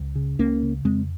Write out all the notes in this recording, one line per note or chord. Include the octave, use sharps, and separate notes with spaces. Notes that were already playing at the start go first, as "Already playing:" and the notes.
Already playing: C#2
C#3
C#2 A#3 C#4
C#3
F2 G#3 C4